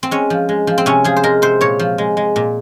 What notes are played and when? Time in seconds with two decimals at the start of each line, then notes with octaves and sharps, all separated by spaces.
0.03 C4
0.11 G#3 C#4
0.30 F3
0.49 G#3
0.67 F3
0.78 C4
0.86 C3 C#4
1.04 F3 G#4
1.16 C5
1.23 G#3 A#4
1.42 C3 C5
1.61 A#2 C#5
1.79 F3
1.98 G#3
2.17 G#3
2.36 A#2